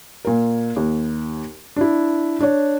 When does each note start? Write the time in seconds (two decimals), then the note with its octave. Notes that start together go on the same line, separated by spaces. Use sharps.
0.25 A#2 A#4
0.76 D#2
1.76 D4 E4
2.40 D4 C#5